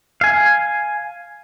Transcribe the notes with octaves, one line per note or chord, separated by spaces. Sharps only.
F5 G#5